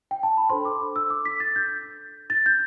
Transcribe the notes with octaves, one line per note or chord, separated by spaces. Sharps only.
G5
A5
B5
D4 A4 C5 C6
D6
E6
D6
B6
A6
G6
A6
G6